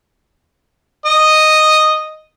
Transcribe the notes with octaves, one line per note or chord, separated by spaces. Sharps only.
D#5